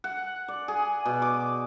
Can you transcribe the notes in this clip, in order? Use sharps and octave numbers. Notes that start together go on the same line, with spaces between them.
F#5
D5
G#4
B2
D6